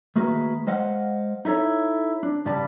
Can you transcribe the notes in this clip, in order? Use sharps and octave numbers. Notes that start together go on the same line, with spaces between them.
D#3 A3 A#3 F#4 G#4 B4
G#3 C5 D#5 F5 F#5
D#4 E4 A4 C#5
D4
G2 C#3 G3 D5 A5 B5